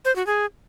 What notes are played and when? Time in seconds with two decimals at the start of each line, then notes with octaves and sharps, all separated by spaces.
0.05 C5
0.16 F#4
0.26 G#4